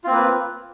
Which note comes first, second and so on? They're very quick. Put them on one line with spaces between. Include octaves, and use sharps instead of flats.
F4 C4 A#3 B4